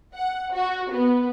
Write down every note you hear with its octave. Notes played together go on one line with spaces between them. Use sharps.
F#5
F#4
B3